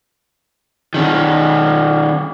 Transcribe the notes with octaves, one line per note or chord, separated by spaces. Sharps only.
D#3 C#4